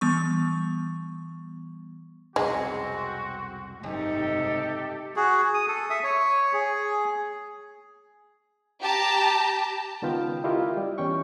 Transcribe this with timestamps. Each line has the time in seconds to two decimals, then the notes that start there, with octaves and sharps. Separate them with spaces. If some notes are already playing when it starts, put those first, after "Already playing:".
0.01 E3 G3 B3 C#6
2.36 C2 F2 B2 G#3 C4 F#4
3.83 F#1 G#2 C3 D#4 G4 A4
5.16 F#4 G#4
5.54 D#6
5.67 A4
5.90 E5 D#6
6.03 C#5
6.53 G#4
8.81 G4 A5 A#5
10.02 C#2 D#3 B3 F4 G5
10.44 E4 F4 G4 A#4 D#5
10.77 G3
10.98 E2 C#4 G5 C#6